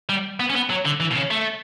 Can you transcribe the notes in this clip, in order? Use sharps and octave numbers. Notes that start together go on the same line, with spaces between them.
G3
B3
C#4
B3
F#3
D3
E3
B2
C#3
A3